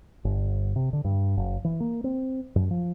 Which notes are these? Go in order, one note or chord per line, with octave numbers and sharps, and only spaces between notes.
G1
C3
D3
G2
F#1
E3
A#3
C4
F#2
F3